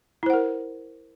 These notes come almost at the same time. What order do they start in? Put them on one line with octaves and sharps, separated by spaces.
E4 C5 F#5 A#4